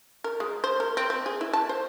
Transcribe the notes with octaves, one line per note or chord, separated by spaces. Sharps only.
A#4
G#3
C5
A#4
C4
C4
G#4
E4
A5
C5